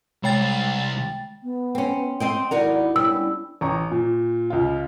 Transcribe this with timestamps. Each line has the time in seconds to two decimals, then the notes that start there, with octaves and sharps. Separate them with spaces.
0.24 C2 G#3 G5 A6
1.43 B3
1.75 C4 C#4
2.20 C4 D#5 G5
2.51 D#2 G#2 D#4 E4 F#4 A#4 D5
2.96 G3 B3 C#4 D4 E6
3.61 A1 A#5 C#6
3.91 A#2
4.50 C#2 F4